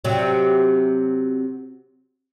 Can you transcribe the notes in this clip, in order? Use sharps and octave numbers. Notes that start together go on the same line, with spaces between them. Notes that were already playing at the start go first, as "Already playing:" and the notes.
C3 F#3